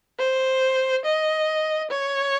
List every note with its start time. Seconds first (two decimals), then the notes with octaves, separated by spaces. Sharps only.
0.19 C5
1.05 D#5
1.91 C#5